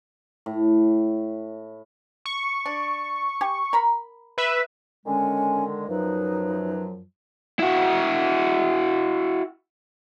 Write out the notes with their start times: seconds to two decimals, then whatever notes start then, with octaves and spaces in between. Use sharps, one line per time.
0.46 A2
2.26 C#6
2.66 D4
3.41 G4 G#5
3.73 A#4 A#5 B5
4.38 B4 E5
5.06 D3 D#3 G#3 C#4 G#5
5.88 F#2 F3 F#3 D#4 B4
7.59 E4 F#4